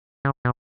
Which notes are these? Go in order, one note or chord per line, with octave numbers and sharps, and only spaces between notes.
C#3
B2